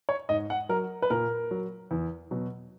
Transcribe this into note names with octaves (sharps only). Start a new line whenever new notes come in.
C#5
G#2 D#5
F#5
F#3 A#4
B4
A#2 A#4
F#3
E2
B2 F#3